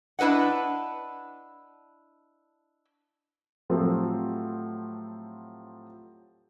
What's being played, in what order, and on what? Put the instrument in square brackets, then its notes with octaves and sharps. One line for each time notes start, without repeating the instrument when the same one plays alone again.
[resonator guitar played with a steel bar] D4 E4 B4 D#5 F#5
[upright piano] A2 F3 F#3 A3 C4 G4